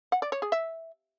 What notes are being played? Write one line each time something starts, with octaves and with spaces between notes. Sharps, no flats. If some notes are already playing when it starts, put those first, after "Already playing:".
F#5
D5
C#5
G#4
E5